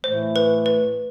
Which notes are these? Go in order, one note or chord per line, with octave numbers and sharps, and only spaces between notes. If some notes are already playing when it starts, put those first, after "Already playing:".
A2 E3 A3 C5
B4
B4